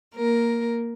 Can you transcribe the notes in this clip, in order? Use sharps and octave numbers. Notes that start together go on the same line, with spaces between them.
A#3 A#4